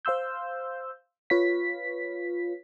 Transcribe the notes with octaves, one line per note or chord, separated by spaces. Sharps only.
C5 F5 C6 E6 G6
F4 B4 C#5 F5 B6